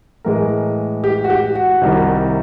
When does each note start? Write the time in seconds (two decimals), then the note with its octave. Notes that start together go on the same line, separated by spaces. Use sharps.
0.24 A2 E3 G#3 A#4
1.04 G4
1.24 F#4
1.30 G4
1.55 F#4
1.82 C2 C3 D#3 G3